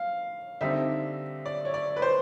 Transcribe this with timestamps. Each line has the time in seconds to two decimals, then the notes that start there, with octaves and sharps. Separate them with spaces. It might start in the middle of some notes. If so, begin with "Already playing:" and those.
Already playing: F5
0.61 D3 G3 C4 D#4 E5
1.46 D5
1.65 C#5
1.74 D5
1.97 B4
2.02 C5